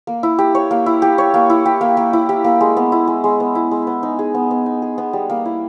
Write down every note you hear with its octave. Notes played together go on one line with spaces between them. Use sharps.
A#3
E4
G4
C#5
A#3
E4
G4
C#5
A#3
E4
G4
A#3
A#3
E4
G4
A#3
G#3
B3
E4
G#3
G#3
B3
E4
G#3
B3
D#4
G#4
B3
B3
D#4
G#4
B3
G3
A#3
E4